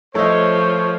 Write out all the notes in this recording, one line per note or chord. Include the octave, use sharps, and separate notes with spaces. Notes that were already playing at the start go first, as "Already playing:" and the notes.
F3 A3 A4 C#5 D#5